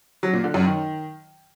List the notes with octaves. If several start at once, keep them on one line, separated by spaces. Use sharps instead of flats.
F#3
A#2
D3
F#2
D#3